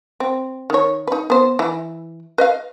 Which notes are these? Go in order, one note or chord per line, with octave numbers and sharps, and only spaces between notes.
C4
D#3 C#5
D#4 B4
B3 C5
E3 E4
B4 D#5 F5